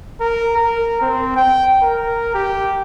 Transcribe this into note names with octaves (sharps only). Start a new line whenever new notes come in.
A#4
A#4
C4
G5
A#4
G4